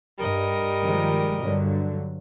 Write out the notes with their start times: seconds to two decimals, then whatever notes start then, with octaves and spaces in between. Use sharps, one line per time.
0.19 G2 G3 A#4 D#5
0.82 D#3 F3 G#3
1.41 G2 D3 F#3